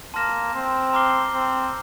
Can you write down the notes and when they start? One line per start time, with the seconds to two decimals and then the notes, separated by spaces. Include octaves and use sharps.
0.14 A#3 A5 C6 F6 A#6 E7
0.54 C4
0.93 A#5 D6 F6 C7 G7
1.34 C4